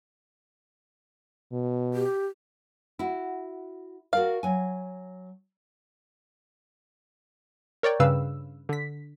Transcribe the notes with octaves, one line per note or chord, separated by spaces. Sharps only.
B2
G4
E4 F#4
F#4 A#4 D5 F5
F#3 G#5
A#4 C#5 D5 G5
G2 C#3 B4 F5 E6
D3 B6